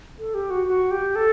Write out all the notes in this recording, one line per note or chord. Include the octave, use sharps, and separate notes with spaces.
A4
G4
F#4
F#4
G4
A4